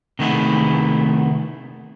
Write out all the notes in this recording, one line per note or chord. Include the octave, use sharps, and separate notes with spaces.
C3 D#3 A3 B3 E4 G#4